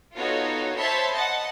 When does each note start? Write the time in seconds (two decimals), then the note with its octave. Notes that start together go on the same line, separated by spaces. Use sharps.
0.17 B3 D#4 F4 F#4 A4 C#5
0.78 C5 C#5 E5 A5 B5 C6
1.14 D#5 F#5 A5